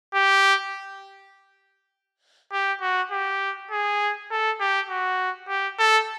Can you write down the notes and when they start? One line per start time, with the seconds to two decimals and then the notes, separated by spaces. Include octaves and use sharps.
0.14 G4
2.52 G4
2.81 F#4
3.11 G4
3.71 G#4
4.31 A4
4.60 G4
4.89 F#4
5.48 G4
5.78 A4